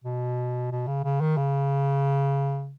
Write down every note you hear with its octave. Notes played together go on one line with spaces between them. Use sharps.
B2
B2
C#3
C#3
D#3
C#3